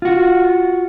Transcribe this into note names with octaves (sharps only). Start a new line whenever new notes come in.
F4 F#4